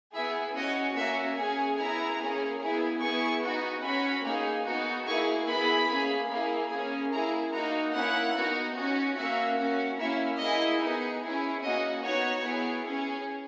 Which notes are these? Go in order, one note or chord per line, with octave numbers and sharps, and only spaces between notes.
B3 E4 G#4 E5
C#4 F#4 D#5
A#3 C#4 F#4 E5
C#4 G#4 G#5
B3 E4 G#4 A#5
A#3 C#4 G#4
B3 E4 G#4
B3 E4 G#4 C#6
B3 D#4 F#4
C#4 F#4 B5
A#3 D#4 G#4
B3 D#4 F#4
A#3 E4 G#4 C#6
B3 E4 G#4 B5
A#3 C#4 G#4
A#3 E4 G#4
A#3 C#4 G#4
A#3 E4 G#4 A#5
A#3 D#4 F#4 A#5
A#3 C#4 E4 F#5
B3 D#4 F#4
C#4 F#4
A#3 C#4 F#4 E5
C#4 F#4
A#3 C#4 E4 E5
A#3 E4 G#4 D#5
B3 D#4 G#4
C#4 E4 G#4
A#3 C#4 F#4 D#5
B3 D#4 F#4 C#5
B3 E4 G#4
C#4 G#4